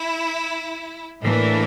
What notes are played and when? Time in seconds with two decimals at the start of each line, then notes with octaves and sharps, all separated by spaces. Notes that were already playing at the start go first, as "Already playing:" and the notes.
Already playing: E4
1.23 A2 E3 A#3 D4